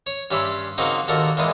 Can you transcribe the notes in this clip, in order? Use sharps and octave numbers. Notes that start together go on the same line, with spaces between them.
C#5
G2 C#4 G4 E5 B5 C6
C#3 F#3 A#3 C4 D#4
D#2 A#2 F#4 A4 A#4 A#5
E2 A#2 E3 G#3 D#6